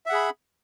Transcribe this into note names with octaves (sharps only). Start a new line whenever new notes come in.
G#4 E5 F#5 B5